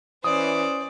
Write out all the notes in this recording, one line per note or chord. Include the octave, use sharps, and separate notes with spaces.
E3 C#4 C5 D5 D#6